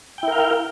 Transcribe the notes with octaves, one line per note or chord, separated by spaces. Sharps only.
E4 A#4 F5 G5